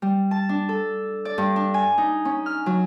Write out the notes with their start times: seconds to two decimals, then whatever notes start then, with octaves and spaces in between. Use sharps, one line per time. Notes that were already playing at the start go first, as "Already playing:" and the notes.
0.02 G3
0.31 A5
0.49 D4
0.69 A4
1.25 D5
1.38 G2
1.56 D4
1.74 G#5
1.98 D#4
2.25 C#4
2.46 F6
2.66 F#3